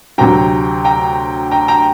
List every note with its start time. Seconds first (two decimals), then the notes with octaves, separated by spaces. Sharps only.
0.18 D2 C3 F#3 G5 A#5
0.85 G5 A#5
1.51 G5 A#5
1.68 G5 A#5